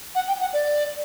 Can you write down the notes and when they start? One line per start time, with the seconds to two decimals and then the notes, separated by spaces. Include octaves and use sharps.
0.15 F#5
0.28 G5
0.40 F#5
0.53 D5